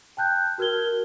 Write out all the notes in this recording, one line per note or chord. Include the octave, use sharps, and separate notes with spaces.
G5 A5 F#6 G6
F#4 A#4 F6 G#6 G7